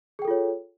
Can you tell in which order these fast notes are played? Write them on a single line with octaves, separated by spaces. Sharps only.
G#4 G5 A4 F4 C#5